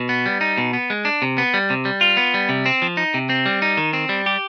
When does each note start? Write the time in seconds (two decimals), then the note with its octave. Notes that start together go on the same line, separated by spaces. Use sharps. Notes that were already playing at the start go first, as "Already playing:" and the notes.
Already playing: B2
0.09 B3
0.26 G3
0.41 D#4
0.58 B2
0.73 B3
0.90 G#3
1.05 D4
1.22 C3
1.38 B3
1.54 G3
1.70 C3
1.85 G3
2.01 F4
2.17 B3
2.34 G3
2.49 C3
2.66 C4
2.82 F3
2.97 D#4
3.14 C3
3.29 C4
3.46 G3
3.62 D#4
3.77 D#3
3.93 C4
4.09 G3
4.26 G4